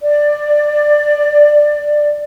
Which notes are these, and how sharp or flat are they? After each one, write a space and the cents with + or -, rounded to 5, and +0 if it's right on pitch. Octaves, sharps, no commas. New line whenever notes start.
D5 +10